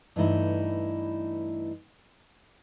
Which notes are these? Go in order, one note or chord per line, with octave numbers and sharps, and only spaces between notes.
G2 E3 A3 D#4 E4